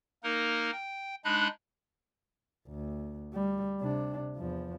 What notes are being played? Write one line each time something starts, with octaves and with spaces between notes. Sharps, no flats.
A#3 D#4 A#4
G5
G#3 D4 D#4 B5 F#6
D2
G3
C3 D4
E2 F3